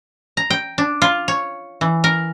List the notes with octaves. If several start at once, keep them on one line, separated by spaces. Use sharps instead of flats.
A#5
G5
D4
F4
C#5
E3
A#4